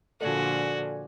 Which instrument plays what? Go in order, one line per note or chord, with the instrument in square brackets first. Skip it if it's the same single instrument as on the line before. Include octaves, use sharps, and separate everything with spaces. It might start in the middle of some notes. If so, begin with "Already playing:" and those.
[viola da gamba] A#2 D3 F3 [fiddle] F#4 [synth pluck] A4 D5 G#5